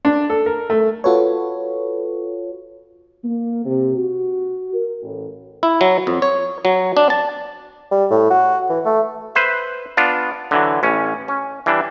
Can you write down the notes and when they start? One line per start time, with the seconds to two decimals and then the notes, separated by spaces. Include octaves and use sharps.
0.05 D4
0.30 A4
0.46 A#4
0.70 A3
1.04 F4 F#4 A4 B4 C#5
3.23 A#3
3.65 C3
3.96 F#4
4.74 A#4
5.03 A1
5.63 E4
5.81 F#3
6.07 F2
6.22 C#5
6.65 F#3
6.97 D4
7.10 A5
7.92 G3
8.11 A2
8.31 F#4
8.69 E3
8.85 A3
9.35 B4 C5 E5
9.97 B3 D4 F4
10.51 D3 E3 F#3
10.83 A1 C#4
11.28 C#4
11.66 E3 G3 D4